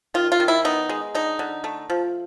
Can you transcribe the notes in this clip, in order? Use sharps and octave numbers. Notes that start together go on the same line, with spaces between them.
D#3 F4
F4
D#3
E4
B3 D#4
G#3
D3 D#4
D3
A3
F3